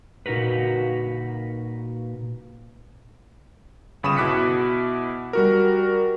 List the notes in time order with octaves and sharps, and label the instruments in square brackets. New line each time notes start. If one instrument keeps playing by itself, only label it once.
[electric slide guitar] A#2 D#4 F#4 A#4 B4
[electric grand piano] G1 C#3 B5 C#6 D#6 E7
B2 E4 D6 F#6 B6 C#7
G3 F#4 A#4